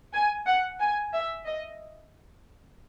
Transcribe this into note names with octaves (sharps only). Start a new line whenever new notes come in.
G#5
F#5
G#5
E5
D#5